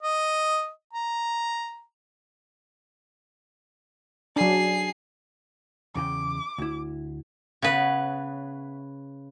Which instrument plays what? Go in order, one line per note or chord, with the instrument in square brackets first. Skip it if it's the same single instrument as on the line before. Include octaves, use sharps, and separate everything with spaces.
[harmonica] D#5
A#5
[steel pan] F#3 D4 [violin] G#4 C7
[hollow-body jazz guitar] E2 C#3 G5 [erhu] D6
[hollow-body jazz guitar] D2 E4
[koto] C#3 B4 [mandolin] B3 E4 C#5